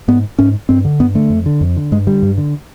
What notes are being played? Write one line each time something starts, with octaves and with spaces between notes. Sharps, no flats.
G#2 B3
G#2 C#4
G2 C4
D3
G2 B3
D3 A3
F2
D3
F2
D3
G2 G#3
D3 G3
G2
D3